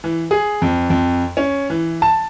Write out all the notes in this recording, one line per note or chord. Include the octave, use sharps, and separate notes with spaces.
E3
G#4
F2
F2
C#4
E3
A5